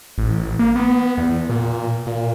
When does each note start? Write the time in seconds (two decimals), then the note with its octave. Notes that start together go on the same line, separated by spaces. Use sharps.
0.18 A1
0.59 A#3
0.76 B3
1.18 E2
1.50 A#2
2.07 A#2